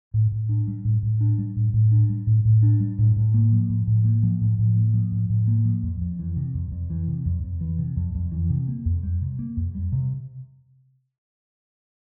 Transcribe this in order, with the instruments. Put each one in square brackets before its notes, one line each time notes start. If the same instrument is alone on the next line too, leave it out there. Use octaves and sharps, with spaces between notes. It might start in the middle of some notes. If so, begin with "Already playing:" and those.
[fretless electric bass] A2
A2
D4
G3
A2
A2
D4
G3
A2
A2
D4
G3
A2
A2
D4
G3
A2
A2
A#3
F3
A2
A2
A#3
F3
A2
A2
A#3
F3
A2
A2
A#3
F3
F2
F2
E3
C3
F2
F2
E3
C3
F2
F2
E3
C3
F2
F2
E3
C3
A#3
F2
G3
C3
A#3
F2
G3
C3